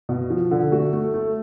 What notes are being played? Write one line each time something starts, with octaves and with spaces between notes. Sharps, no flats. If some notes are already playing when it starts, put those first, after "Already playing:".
B2
F3
D3
A3 F#4
A3
A3